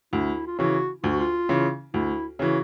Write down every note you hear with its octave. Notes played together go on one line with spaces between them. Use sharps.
D2 E4
F4
C#3 E3 F#4
D2 F4
F#4
F4
C#3 E3
D2 E4
C#3 E3 F#4